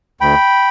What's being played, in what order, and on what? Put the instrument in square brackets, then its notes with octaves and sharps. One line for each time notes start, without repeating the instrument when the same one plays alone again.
[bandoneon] D2 G5 B5